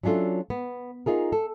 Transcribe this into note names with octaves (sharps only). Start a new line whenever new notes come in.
F#3 C#4 D4 F4 A4
B3
D#4 F4 G#4 A#4
A4